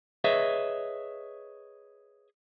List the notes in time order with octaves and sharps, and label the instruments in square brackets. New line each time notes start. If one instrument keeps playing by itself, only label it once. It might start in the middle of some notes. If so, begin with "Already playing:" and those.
[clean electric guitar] G#4 B4 C#5 D#5 E5